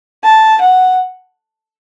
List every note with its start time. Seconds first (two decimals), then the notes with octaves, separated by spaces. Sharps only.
0.24 A5
0.61 F#5